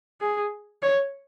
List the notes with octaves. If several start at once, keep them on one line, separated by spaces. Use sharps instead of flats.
G#4
C#5